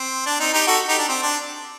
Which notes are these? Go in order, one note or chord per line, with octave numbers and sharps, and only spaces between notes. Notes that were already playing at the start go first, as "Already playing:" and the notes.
Already playing: C4
D4
C4 D#4
D#4 G4
F#4 A4
D#4 G4
D4
C4
D4